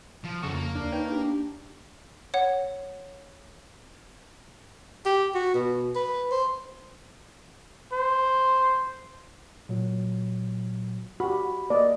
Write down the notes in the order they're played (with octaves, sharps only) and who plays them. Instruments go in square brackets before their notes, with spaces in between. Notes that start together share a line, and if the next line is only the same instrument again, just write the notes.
[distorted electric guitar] F3
[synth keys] F2 C#3 C#6 [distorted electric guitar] F#4 A4
[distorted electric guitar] A#3
[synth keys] D#2 D4
[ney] D#4 [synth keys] B4 C#5 G5
[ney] D4 [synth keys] G4
[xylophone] C#5 F#5
[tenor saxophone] G4
F#4
B2
B4
C5
[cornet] C5
[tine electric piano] A#2 F#3
[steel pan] F#4 G4 [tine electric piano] B5
[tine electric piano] A#3 [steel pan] D5 D#5